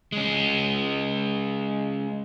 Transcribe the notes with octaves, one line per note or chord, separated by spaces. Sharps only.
G#3 C#4